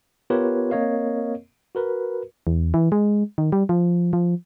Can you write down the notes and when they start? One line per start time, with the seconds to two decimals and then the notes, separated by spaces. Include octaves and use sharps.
0.30 B3 F4 G4 A#4 B4 C#5
0.71 A#3 C4 A#4 C#5 D#5 F5
1.75 F#4 A#4 B4
2.47 E2
2.74 E3
2.92 G#3
3.38 D#3
3.52 G3
3.69 F3
4.13 F3